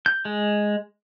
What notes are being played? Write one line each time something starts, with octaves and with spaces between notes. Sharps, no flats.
G6
G#3